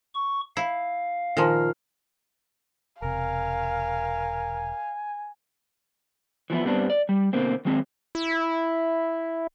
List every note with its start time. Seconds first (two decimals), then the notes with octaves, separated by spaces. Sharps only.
0.15 C#6
0.57 E4 F5
1.37 A#2 D#3 F3 F4
3.02 E1 C3 A#4 F5 G#5
6.50 E3 F3 B3 E4
6.64 G2 G3 B3 C4 D4
6.90 D5
7.09 G3
7.33 B2 D3 A#3 C4
7.65 D#3 F#3 G#3 C4
8.15 E4